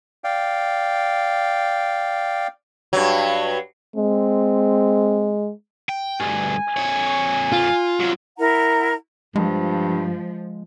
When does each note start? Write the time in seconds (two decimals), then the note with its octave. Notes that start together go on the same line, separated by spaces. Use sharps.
0.24 D5 F5 G5
2.93 G2 F#3
3.96 G#3 C4
5.89 G5
6.20 D2 G2 G#5
6.77 F2 C#5
7.52 F4
8.00 C2 F#3
8.38 E4 A#4 F#5 A#5
9.36 G2 F3 G#3